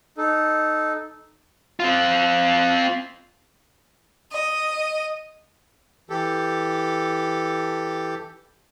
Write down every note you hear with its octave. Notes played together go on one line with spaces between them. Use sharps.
D#4 A4
C4 F4
D#5
E3 G4 A4